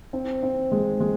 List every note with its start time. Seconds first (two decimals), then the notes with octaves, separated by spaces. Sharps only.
0.13 C4
0.43 C4
0.72 G#3
1.00 G#3